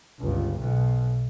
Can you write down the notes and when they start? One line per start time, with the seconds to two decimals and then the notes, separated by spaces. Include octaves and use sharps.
0.20 G1 C#2
0.59 B1 B2